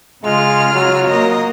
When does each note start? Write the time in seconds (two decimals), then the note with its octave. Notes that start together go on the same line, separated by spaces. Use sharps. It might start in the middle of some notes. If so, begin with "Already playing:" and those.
0.24 C#3 G#3 F4 F6
0.74 F#3
1.08 A#3 A#4 D#5